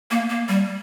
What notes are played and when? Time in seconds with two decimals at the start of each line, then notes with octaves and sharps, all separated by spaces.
0.11 A#3
0.30 A#3
0.49 G3